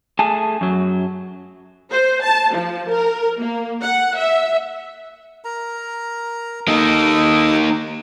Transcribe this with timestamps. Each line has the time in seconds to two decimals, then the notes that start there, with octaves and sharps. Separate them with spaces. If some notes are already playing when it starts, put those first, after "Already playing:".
0.19 A3 G#4 G#5 A5
0.61 F#2 F#3
1.92 C5
2.24 A5
2.55 F3
2.89 A#4
3.39 A#3
3.82 F#5
4.17 E5
5.45 A#4 A#5
6.68 A#3 D#4 A4 D#5 D#6